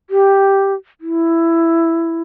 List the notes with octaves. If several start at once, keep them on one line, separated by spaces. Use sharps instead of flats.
G4
E4